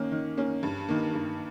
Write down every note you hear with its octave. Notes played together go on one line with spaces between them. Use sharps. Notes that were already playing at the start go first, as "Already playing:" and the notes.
Already playing: D#3 A#3 C#4
D#3
A#3 C#4
G2
D#3 A#3
G2